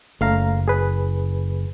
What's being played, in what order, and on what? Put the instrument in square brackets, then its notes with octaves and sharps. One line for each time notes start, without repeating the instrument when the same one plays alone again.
[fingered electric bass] F#1 [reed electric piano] A3 F5 A#5
[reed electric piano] G#4 B4